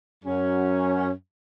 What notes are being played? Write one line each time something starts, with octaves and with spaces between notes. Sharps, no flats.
F#2 F#3 C#4